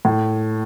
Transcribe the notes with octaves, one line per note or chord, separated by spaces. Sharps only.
A2